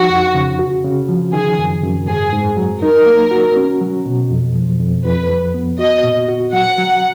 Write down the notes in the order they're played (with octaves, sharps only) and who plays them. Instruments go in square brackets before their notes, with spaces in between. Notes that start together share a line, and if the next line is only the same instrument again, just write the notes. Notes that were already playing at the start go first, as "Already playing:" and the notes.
Already playing: [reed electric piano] F3 D#4 [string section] F#4
[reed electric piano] F2
C#3
F#4
C#3
F3
[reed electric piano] D#3 [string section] G#4
[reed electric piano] F#2
F#2
[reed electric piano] G#2 [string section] G#4
[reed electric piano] G#2
F#3
[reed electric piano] D#4 [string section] A#4
[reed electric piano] A#3
F#4
C#4
F#3
B2
F2
F3
F2
[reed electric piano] F2 [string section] B4
[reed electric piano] F3
B3
[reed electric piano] F#4 [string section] D#5
[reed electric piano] A#2
F#4
[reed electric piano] F#3 [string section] F#5
[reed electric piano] F#3